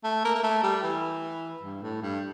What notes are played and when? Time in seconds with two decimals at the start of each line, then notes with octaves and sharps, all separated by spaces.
0.04 A3
0.25 A#3
0.35 A#3
0.44 A3
0.63 G3
0.83 E3
1.63 G2
1.82 A2
2.02 G2